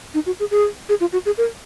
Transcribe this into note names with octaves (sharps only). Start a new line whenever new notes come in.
D#4
F#4
G#4
G#4
G#4
F4
F#4
G#4
A#4